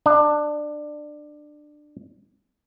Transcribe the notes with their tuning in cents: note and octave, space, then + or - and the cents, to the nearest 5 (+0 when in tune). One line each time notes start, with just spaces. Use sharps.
D4 +20